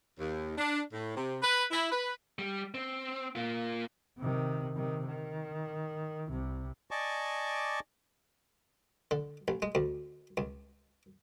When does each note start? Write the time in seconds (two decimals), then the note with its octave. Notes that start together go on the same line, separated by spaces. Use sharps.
0.19 D#2
0.58 D4
0.93 A2
1.16 C3
1.42 B4
1.71 E4
1.92 B4
2.39 G3
2.74 C4
3.35 A#3 F4
4.19 C3 D#3
4.76 C3 D#3
5.08 D#3
6.27 C2 C3
6.91 D5 D#5 G#5 A5 C#6 D6
9.11 D3
9.48 A1
9.62 G#3
9.75 D2
10.37 C#2